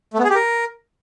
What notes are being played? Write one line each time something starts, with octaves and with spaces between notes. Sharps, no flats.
A3
B3
G#4
G4
A#4